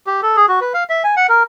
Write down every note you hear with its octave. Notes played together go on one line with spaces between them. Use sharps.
G4
A4
G#4
F#4
B4
F5
E5
G#5
F#5
A#4